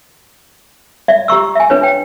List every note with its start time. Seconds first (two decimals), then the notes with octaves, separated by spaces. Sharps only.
1.08 D5 E5
1.28 G4 A#5 C#6 E6
1.55 E5 G#5
1.70 D4 B4 C#5
1.83 G5